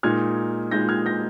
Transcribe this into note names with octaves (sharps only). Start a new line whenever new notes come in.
A#2 G#3 D#4 F6 G#6
A#2 G#3 D#4 G6 A#6
F6 G#6
G6 A#6